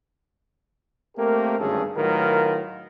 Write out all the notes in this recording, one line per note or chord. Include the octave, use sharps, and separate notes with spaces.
A3 A#3 C4 G4 A#4
G#1 D2 G2 C#4 G#4 A4
A2 D#3 F#3 F4 A#4 B4